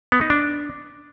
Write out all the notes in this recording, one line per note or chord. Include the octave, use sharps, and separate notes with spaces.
B3
D#4
D4